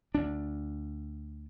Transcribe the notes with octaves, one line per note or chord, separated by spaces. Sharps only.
D2 D4